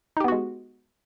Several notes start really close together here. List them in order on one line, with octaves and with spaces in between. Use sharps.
D#4 G4 B3 F#4 G#3